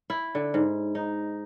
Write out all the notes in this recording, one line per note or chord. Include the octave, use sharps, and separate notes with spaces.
E4
D3
G#2
D#4